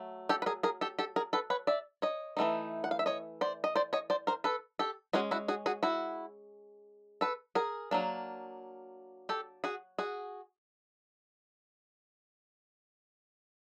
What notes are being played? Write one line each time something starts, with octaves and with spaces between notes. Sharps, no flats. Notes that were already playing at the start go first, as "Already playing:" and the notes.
Already playing: F#3 A3
G4 A4
B4
G#4 A#4
G#4 A#4
G4 A4
G4 A4
G#4 A#4
A4 B4
B4 C#5
D5 E5
C#5 D#5
E3 A3 C4 D#4
F#5
F5
E5
C#5 D#5
C5 D5
D#5
C5 D5
C#5 D#5
C5 D5
A#4 C5
A4 B4
G4 A4
G#3 C#4 F#4 G#4
E4 F#4
F#4 G#4
F#4 G#4
E4 F#4
A4 B4
G#4 A#4
F#3 A#3 D4
G4 A4
F#4 G#4
F#4 G#4